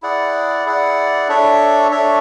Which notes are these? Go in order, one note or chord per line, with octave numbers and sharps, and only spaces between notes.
E4 G#4 D5 F#5
E4 G#4 D5 F#5
D4 A4 C#5 E5
D4 A4 C#5 E5